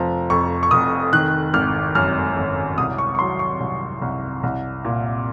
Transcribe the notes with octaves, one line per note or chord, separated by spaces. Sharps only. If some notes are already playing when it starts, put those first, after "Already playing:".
Already playing: F1 F3 A#5
F2 C#6
C#6
F1 D#6
D#3 F#6
G#1 F6
F#2 F6
G#1
C2 D#6
C#6
C#6
F#3 C6
C#6
C2
C2
C2
A#2